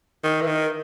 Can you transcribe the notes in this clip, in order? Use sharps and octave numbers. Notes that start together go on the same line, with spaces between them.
D#3
E3
D#3